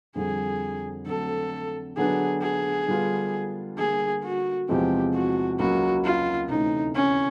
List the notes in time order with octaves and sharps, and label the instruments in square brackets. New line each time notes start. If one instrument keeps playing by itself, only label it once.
[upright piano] F2 D3 G3 [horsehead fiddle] G#4
[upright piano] D3 F#3 A3 C4 [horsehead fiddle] A4
[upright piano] D3 F#3 B3 D4 [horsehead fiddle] G#4
[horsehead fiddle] G#4
[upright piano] D3 G3 B3 D4 F4
[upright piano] D3 G3 A#3 [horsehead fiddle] G#4
[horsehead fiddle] F#4
[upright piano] E2 C3 F3 G#3 C4 [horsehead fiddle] G4
[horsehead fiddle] F#4
[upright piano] C#2 C#3 F#3 A#3 [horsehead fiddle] F#4
[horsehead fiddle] F4
[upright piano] D2 C3 E3 A3 C#4 [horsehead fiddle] D#4
[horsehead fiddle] C#4